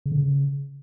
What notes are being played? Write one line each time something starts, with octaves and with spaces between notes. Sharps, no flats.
C#3
D3
C#3